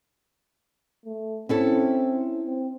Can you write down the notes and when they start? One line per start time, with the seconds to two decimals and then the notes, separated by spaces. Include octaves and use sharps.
1.06 A3
1.49 C4 C#4 E4 A4
2.47 C4